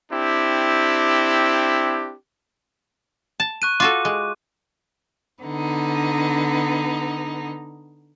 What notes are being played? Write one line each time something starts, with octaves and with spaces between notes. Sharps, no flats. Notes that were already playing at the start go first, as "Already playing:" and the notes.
C4 D4 E4 G4
A5
C#6 F#6 D#7
F4 F#4 A4 D6
G#3
D3 B3 D#4